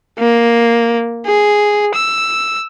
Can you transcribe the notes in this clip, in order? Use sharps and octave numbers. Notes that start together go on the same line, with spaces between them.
A#3
G#4
E6